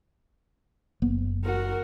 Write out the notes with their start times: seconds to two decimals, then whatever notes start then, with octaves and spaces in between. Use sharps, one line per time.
1.02 F#1 A#3 B3
1.44 F#4 A#4